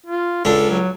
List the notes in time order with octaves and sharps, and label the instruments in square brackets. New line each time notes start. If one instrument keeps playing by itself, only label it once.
[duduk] F4
[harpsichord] C#2 D4 [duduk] A4
[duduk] F#3